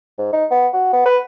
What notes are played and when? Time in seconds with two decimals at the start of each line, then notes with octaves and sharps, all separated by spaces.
0.19 G#2
0.33 D#4
0.51 B3
0.74 F#4
0.93 B3
1.06 B4